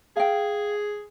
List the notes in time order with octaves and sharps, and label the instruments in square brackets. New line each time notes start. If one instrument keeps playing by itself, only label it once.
[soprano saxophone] G#4 [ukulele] F5 G5